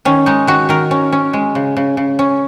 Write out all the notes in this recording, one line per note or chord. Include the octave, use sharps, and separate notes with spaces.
D#3 C#4
G#3 D#4
D#3 F#4
D#3 A#4
C#4
C#4
G#3
C#3
C#3
C#3
C#4